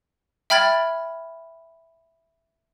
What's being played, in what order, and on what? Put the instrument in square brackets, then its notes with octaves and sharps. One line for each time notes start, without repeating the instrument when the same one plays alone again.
[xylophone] E5 G5 B5 F6 G#6 A6